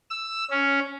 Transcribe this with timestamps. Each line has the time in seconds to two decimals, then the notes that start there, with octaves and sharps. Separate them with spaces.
0.10 E6
0.51 C#4